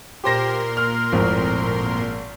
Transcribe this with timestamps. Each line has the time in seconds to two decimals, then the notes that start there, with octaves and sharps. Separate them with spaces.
0.24 A#2 G4 A#4 C5 C6 A#6
0.77 F6
1.12 G#1 F2 A2 F3